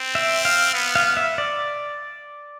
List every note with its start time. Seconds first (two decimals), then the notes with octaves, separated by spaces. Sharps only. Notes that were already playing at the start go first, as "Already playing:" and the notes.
Already playing: C4
0.15 E5
0.45 F5
0.74 B3
0.96 F5
1.17 E5
1.38 D5